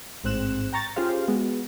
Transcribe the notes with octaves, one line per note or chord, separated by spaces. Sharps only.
A1 G#2 C4 F#6 E7
G5 A#5 C#6 A6
C#4 F4 G4 G#4 C5 F5
G#3 B3 F#4